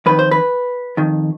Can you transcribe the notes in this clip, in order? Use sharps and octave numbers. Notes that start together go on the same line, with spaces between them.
F2 D#3 B4
C5
B4
F2 D#3